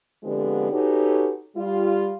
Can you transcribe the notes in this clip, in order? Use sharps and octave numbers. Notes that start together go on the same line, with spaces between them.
D3 F3 G#3 B3 C4 G4
C#4 D#4 F#4 G4 A4 B4
G3 F4